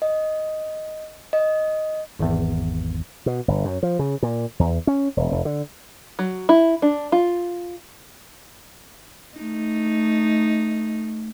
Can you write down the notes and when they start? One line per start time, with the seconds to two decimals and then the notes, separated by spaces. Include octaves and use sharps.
0.02 D#5
1.33 D#5
2.19 G#1 E2
3.26 B2
3.48 G1
3.65 F#2
3.83 F3
3.99 C#3
4.23 A#2
4.59 E2
4.87 C#4
5.17 E1
5.31 F1
5.45 D3
6.19 F#3
6.49 E4
6.82 D4
7.12 F4
9.38 A3 D#4